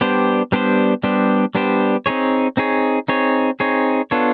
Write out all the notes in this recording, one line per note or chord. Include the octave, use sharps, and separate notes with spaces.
G3 B3 D4 G4 C5
G3 B3 D4 G4 C5
G3 B3 D4 G4 C5
G3 B3 D4 G4 C5
C4 D#4 G#4 C#5
C4 D#4 G#4 C#5
C4 D#4 G#4 C#5
C4 D#4 G#4 C#5
B3 D4 F4 A4 C#5